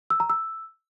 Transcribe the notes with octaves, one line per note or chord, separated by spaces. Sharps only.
E6
A#5
E6